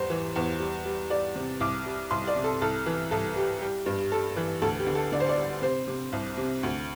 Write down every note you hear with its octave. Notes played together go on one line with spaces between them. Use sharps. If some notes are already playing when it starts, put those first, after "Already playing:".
Already playing: E2 G3 C5
E3
E2
G3
G3
G3 D5
C3
C2 D6
G3
C2 C6
D5
C3
A4
C2 A4
E3
C2 A4
G3 G4
G3 G4
G2
G3 A4
E3
D2 A4
G4
D3
A4
D3 D5
C5
D5
G3
C3 C5
C3
C2
C3
D2